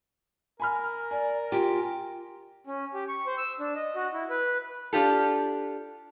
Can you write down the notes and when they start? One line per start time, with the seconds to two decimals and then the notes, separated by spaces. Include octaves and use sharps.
0.60 A#4 G#5 B5 F6
1.11 D5 G#5
1.52 F4 G4
2.67 C#4
2.94 G4
3.08 C#6
3.26 C5
3.38 E6
3.60 D4
3.75 D#5
3.95 F#4
4.14 E4
4.30 B4
4.93 D4 F4 G4 A4